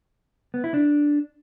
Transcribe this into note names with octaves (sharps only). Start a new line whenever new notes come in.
B3
E4
D4